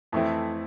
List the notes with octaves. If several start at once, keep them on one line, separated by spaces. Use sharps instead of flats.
F2 E3 A3 C4 E4